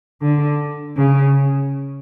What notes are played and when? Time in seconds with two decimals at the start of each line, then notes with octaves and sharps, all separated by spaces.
0.22 D3
0.97 C#3